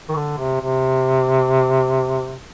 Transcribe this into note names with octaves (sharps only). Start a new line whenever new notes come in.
D#3
D3
C3
C3